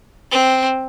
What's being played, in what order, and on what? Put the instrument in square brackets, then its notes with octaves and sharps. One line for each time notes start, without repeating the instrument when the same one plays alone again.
[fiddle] C4